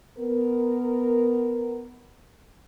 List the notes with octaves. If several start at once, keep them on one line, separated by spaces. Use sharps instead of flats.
B3 A#4